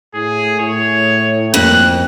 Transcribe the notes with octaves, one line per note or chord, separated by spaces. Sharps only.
A2 G#4
A2 C#5
F2 A#3 F#6